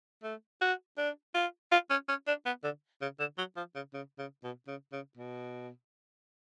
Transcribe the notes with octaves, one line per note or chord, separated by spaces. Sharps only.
A3
F#4
D4
F4
F4
C#4
C#4
D4
B3
D3
C#3
D3
F#3
F3
C#3
C#3
C#3
B2
C#3
C#3
B2